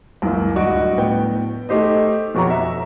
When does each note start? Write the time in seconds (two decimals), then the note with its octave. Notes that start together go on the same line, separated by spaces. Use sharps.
0.22 C#2 F#2 E3 A#3
0.55 D1 G3 F#4 D#5 D7
0.97 A2 B3 G5
1.69 A3 D#4 G4 C5 D#5
2.35 F2 B2 F#4 G4 C#5 A#5
2.50 E5 A#5